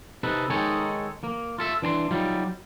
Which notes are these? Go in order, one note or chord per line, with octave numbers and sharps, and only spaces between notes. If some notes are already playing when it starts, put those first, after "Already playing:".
C3 D#4 A4 B4
D#3 G#3 D#4 A4 C#5
A#3
F4 A4 E5
E3 D4 A5 C6
F#3 G3 D#4 F4